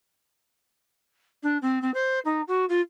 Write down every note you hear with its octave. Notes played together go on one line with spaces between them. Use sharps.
D4
C4
C4
C5
D#4
F#4
F4